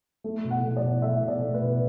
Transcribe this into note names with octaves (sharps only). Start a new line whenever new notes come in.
A3
B2
F#5
A3
D5
B2
A3 E5
B2
D5
A3
B4
B2